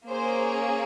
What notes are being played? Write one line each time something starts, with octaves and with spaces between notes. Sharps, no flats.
A#3 C#4 G#4 C5